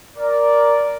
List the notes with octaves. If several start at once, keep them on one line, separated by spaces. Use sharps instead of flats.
A#4 D5